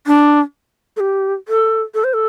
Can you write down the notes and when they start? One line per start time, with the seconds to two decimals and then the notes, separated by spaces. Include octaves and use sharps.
0.07 D4
0.97 A4
1.00 G4
1.48 A4
1.94 A4
2.04 C5
2.14 A4